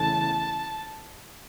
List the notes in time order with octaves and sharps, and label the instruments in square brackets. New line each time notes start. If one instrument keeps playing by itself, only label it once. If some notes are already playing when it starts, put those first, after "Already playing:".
Already playing: [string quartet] E2 C#3 E3 A3 A5